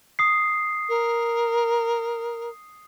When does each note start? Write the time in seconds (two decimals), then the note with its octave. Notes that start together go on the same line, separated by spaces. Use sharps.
0.19 D#6 C7
0.89 A#4